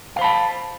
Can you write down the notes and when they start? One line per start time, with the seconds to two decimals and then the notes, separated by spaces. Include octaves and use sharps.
0.16 F5
0.19 C5
0.21 B5
0.24 A5